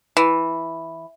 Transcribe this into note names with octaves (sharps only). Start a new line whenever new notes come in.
E3